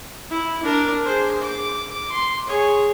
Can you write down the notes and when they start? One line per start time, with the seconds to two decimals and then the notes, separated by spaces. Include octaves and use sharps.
0.30 E4
0.63 D4 A#4
1.04 G#4 C5
1.42 D6
2.12 C6
2.47 G#4 C#5